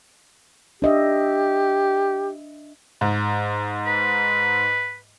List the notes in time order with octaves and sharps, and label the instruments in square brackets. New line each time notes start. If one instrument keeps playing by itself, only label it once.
[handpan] D4 D#5 E5 [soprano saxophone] G4
[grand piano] G#2
[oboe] B4